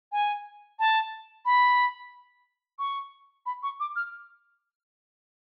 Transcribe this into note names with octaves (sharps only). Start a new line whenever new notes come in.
G#5
A5
B5
C#6
B5
C#6
D6
F6